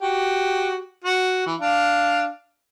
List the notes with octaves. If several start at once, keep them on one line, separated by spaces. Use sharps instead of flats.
F#4 G4
F#4
E3
D4 F5